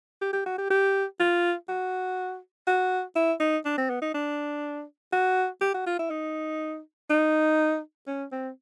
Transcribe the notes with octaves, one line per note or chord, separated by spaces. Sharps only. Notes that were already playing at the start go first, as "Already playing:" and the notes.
G4
G4
F#4
G4
G4
F4
F#4
F#4
E4
D#4
D4
C4
B3
D#4
D4
F#4
G4
F#4
F4
E4
D#4
D#4
C#4
C4